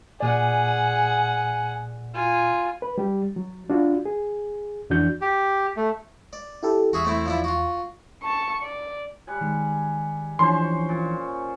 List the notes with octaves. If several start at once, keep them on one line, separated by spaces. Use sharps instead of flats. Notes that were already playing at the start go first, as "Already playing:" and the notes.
A#2 G#4 D5 F#5 G#5
F4 G#5
B4
G3 G4
F#3
D4 F4 F#4
G#4
F2 E3 D4 F#4 G6
G4
A3
D5
E4 G4 A4
E2 F#4 G#4 E5
A3 C4 E4
F3 D4 E4
F4 F#4
A5 C#6
D5
G3 F#5 G#5
D#3 G#3
E3 F3 C#4 D4 C5 C6
A#2